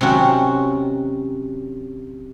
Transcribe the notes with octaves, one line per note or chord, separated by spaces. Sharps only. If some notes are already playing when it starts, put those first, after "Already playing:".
C3 D#3 F#3 C4 C#4 F#4